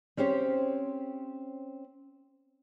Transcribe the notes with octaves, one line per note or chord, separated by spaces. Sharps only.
C4 C#4 G4 C5 C#5